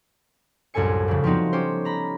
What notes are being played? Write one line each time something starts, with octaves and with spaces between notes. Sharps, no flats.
C2 F#2 A2 A4 G#5 C#7
F2 C#3
F3 B3 C4 D#4 F#4
C#4 G4 C5
A#5 B5